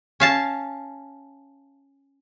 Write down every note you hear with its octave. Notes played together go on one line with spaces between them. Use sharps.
C#4 F5 A5